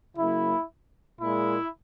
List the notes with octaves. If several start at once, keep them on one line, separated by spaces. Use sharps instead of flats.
C#3 F#3 A#3 E4
A#2 G#3 E4